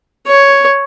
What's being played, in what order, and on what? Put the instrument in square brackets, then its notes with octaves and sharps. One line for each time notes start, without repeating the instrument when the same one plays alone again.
[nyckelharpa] C#5